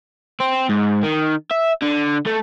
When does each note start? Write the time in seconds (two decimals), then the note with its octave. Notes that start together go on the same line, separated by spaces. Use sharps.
0.40 C4
0.69 G#2
1.03 D#3
1.51 E5
1.82 D3
2.26 A3